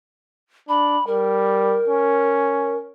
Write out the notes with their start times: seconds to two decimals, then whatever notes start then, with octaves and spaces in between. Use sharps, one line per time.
0.69 D4 B5
1.07 G3 A#4
1.88 C#4